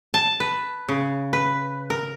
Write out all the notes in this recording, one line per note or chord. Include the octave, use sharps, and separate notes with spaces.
A5
B4
C#3
B4
A#4